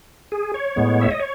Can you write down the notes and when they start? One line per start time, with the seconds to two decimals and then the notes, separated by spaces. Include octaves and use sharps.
0.32 G#4
0.54 C#5
0.76 A2 G#3 B3
1.01 E5
1.11 D#5
1.20 C#5